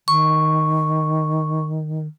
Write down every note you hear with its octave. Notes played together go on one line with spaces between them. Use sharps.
D#3 C#6